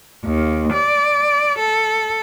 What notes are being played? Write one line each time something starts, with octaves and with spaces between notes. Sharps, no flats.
D#2
D5
A4